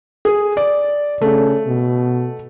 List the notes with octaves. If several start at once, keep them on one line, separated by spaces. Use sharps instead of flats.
G#4
D5
C#3 A3
B2